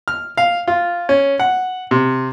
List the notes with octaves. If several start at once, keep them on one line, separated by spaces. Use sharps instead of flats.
F6
F5
F4
C#4
F#5
C3